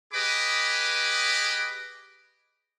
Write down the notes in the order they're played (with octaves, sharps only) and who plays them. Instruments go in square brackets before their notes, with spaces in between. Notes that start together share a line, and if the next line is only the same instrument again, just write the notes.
[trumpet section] G4 G#4 B4 D#5 B5 D6